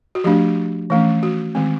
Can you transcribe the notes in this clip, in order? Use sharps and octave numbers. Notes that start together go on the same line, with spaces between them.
F#4
F3 A3 D4 G4
E3 A3 C#4
F#4
D#3 G#3 C4